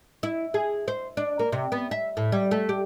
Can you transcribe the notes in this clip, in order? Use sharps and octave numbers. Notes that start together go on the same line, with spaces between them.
E4
G#4
C5
D4
A#3
C3
B3
E5
A2
G3
A3
G4